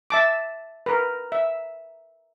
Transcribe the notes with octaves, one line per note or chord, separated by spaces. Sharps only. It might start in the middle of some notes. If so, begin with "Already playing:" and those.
E5 A5 D6
A#4 B4
E5